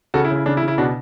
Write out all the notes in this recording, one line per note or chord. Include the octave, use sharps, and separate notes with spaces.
C#3 F#4 A4
E4
C#3
E4
C#3 D4
E4
C#3
E4
B2 D4 F#4